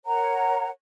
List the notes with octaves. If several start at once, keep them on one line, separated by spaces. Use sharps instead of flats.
A#4 C#5 F#5 A#5